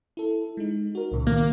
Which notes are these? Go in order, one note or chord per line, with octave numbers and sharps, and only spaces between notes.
E4 A4
G#3 D#4
F#4 A#4
C#2 A#2 C#3
D#3 A#3